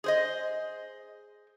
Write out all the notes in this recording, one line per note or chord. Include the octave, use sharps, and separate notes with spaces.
G#4 C5 D#5